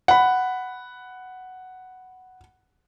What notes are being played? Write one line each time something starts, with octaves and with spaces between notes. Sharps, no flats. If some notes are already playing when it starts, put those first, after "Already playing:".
F#5 B5